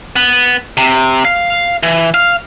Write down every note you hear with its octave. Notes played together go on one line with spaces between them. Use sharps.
B3
C3
F5
E3
F5